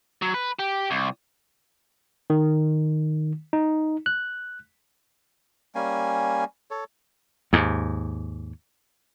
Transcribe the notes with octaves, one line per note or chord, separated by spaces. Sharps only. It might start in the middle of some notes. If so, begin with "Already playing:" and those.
F#3
B4
G4
C2
D#3
D#4
F#6
G3 A#3 C#4 G#5
A4 C#5
D#2 G#2